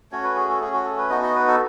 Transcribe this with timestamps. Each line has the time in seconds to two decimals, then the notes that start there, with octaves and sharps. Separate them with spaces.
0.12 A3 C#4 F#4 C#5
0.24 B4
0.36 G#4
0.49 A4
0.60 A3 C#4 F#4 G#4
0.73 F#4
0.86 A4
0.98 B4
1.10 B3 D#4 F#4 D#5
1.23 D#5
1.35 B4
1.48 A4